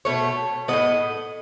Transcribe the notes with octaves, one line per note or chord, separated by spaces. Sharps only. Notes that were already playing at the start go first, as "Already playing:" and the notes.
B2 A3 C#5
A2 G#3 B3 D#5